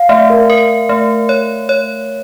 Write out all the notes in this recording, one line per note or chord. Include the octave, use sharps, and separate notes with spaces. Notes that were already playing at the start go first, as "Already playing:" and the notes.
Already playing: F5
A3 E5
A#4
A#4
A3
C#5
C#5